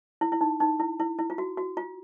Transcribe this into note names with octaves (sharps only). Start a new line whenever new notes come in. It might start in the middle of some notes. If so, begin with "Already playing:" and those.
E4
E4
D#4
D#4
E4
E4
E4
F4
F#4
F#4
F4